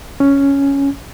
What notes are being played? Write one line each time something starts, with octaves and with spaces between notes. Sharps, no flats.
C#4